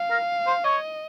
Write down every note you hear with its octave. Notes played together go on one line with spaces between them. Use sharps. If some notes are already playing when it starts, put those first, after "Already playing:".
Already playing: F5
A#4
C5
C#5 D#5